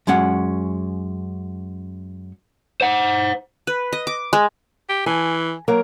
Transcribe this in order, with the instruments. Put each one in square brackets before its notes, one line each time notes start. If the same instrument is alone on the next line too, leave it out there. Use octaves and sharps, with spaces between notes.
[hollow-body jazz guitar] F#2 G#3 C#4 F#5
[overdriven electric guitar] C5 F#5
[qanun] B4
D#5
D6
G#3
[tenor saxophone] G4
[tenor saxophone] E3 [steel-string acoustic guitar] G#5
[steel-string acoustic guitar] F#3 A#3 A#4